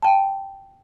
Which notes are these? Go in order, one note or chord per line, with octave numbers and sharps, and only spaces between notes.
G5 A5